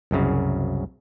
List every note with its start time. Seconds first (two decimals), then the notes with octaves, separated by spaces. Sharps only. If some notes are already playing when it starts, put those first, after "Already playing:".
0.11 C2 F#2 C#3